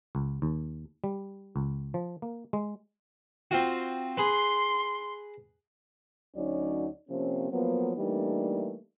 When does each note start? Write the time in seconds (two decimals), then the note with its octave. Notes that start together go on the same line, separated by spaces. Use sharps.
0.15 C#2
0.42 D#2
1.04 G3
1.56 C#2
1.94 F3
2.22 A#3
2.53 G#3
3.51 C4 F4 F#4
4.17 G#4 B4 C6
6.36 D2 F#3 C#4 D#4 D5
7.10 C3 F3 A#3 C4 C#4
7.52 F3 F#3 A#3 B3
7.98 E3 G3 A3 A#3 D4 D#4